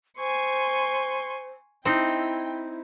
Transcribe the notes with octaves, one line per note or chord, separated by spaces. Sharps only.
C5 G#5 C6 C#6
C4 D#4 E4 G5